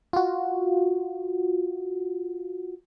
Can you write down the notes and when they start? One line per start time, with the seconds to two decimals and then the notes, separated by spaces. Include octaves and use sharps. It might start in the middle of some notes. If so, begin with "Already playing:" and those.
0.13 F4 F#4